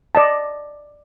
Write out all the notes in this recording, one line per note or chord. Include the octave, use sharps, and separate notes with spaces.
D5 D#5 A5